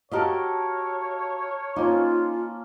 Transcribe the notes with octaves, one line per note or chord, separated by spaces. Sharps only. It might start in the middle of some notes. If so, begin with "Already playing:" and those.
F#4 G4 A4 A#4 C#5 D#5 F5
A#3 C#4 D#4 F4